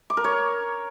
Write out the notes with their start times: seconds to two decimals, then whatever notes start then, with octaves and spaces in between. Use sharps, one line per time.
0.10 D6
0.17 A#4
0.24 C#5